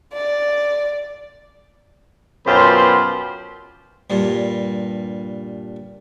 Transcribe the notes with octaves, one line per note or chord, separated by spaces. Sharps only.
D5
F#2 B2 F4 G4 C5 B5
G2 A#2